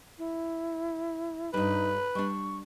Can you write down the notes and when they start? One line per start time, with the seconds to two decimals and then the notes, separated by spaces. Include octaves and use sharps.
0.18 E4
1.54 G2 G3 D#4 B4
2.15 G3 D4 C#6